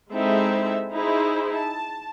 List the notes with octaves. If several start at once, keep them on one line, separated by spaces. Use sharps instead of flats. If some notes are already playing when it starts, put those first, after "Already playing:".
G#3 C4 D#4 E4 A4 E5
D#4 E4 G#4 C5
A5